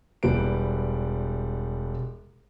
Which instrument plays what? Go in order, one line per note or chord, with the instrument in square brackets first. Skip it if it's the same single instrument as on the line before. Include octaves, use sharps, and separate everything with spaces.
[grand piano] E1 G3 B4 D7